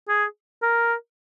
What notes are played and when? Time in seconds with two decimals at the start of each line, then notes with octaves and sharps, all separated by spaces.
0.09 G#4
0.62 A#4